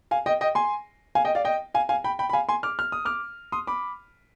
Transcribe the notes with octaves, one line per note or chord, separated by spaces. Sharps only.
F5 G#5
D#5 G5
D#5 G5
G#5 C6
F5 G#5
D#5 G5
D5 F5
D#5 G5
F5 G#5
F5 G#5
G5 B5
G5 B5
B5
F5 G#5
G#5 C6
D6 F6
F6
D#6
D6 F6
C6 D#6
B5 D6